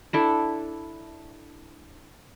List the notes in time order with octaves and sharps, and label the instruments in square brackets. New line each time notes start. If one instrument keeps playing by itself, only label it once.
[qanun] D4 E4 A4